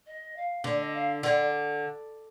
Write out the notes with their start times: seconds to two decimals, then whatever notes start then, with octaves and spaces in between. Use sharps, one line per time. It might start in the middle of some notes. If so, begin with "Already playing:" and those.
0.06 D#5
0.36 F5
0.64 D3 D5
0.79 D#5
0.94 F5
1.23 D3 D5